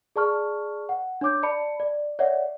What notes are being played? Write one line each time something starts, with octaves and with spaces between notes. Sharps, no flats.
G#4 D5 A5 C#6 F6
F#5
D4 C#5 D6 G6
D5 A5 B5 C#7
D5
C#5 D5 E5 F#5